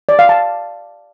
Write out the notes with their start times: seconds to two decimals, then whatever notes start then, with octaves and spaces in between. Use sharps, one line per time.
0.09 D5
0.19 F5
0.29 A5